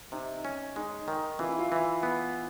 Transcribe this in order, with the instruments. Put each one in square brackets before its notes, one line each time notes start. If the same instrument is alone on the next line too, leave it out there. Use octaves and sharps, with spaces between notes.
[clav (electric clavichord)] C3 [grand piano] D#4
[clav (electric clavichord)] C#4
[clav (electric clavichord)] G#3 [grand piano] D#4
[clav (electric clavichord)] D#3
[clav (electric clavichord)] E3 [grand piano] F4
[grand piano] E4
F4
[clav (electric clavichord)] E3
B3